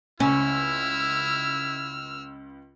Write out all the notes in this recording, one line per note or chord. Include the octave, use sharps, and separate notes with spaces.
C#2 C#4 E4 E6 F6